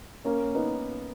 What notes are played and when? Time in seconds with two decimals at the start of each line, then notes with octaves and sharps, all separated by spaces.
0.25 A#3 C#4
0.55 B3 D#4